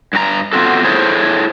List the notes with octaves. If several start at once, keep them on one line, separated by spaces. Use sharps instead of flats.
G2 F#4 A#5
B3 C4 F4 F#4 A4
E4 G#4 A4 C5 C#5